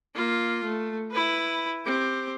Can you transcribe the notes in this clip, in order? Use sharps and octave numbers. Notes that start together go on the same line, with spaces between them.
A#3 F4
A3
E4 B4
C4 G4